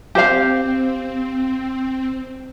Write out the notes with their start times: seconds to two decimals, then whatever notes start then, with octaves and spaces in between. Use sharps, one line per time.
0.15 C4 G4 C5 F5